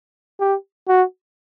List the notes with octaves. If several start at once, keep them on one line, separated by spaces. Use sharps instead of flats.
G4
F#4